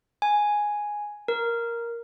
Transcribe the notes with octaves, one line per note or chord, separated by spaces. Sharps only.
G#5
A#4